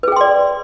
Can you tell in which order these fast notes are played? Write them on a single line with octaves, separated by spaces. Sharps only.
B4 G#4 G5 C6 D5